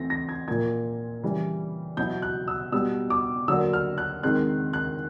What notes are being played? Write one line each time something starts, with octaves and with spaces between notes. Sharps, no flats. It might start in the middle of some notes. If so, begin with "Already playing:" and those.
Already playing: E3 A3 C4 A#6
A#6
G#6
A#2 F3 A#3 G#6
C#3 E3 G3
B2 F#3 B3 E4 G6
F#6
E6
B2 G3 B3 E6
D6
D3 F#3 A#3 D4 E6
F6
F#6
D#3 G#3 C4 F#6
F#6